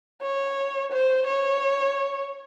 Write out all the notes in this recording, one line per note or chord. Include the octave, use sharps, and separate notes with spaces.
C#5
C5
C#5